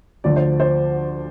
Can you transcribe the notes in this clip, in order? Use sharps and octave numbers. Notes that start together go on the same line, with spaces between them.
D2 D3 F3 D5
C5
C5